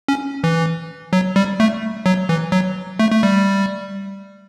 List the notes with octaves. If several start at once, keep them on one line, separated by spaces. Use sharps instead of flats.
C#4
E3
F#3
G3
A3
F#3
E3
F#3
A3
A3
G3